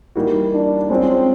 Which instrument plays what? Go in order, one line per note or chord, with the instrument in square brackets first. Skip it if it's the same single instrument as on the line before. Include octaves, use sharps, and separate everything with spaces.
[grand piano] E3 G3 A#3 D#4 F#4
[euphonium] D4
[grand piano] G#3 C#4 F4 [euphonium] C4